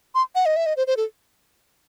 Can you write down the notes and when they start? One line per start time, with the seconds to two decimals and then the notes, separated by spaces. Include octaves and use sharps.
0.15 C6
0.35 F#5
0.46 D#5
0.56 E5
0.66 D#5
0.77 C5
0.87 C5
0.97 A4